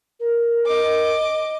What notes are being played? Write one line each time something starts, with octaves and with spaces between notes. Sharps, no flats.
A#4
D#5 D6